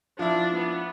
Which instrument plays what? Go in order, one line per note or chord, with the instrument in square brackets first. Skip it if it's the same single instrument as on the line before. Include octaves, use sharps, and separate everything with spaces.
[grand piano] F3 E4 [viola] D4
[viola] B3